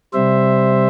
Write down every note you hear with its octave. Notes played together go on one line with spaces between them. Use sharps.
C3 G3 C5 E5